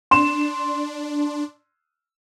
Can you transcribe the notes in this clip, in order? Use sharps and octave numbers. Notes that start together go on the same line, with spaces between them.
D4 C6 E7